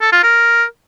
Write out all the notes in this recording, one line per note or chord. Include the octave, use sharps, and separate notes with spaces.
A4
F4
A#4